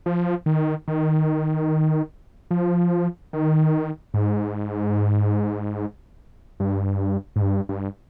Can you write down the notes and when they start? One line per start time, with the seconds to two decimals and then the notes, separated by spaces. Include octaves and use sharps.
0.06 F3
0.46 D#3
0.88 D#3
2.51 F3
3.33 D#3
4.14 G#2
6.60 G2
7.36 G#2
7.42 G2
7.69 G2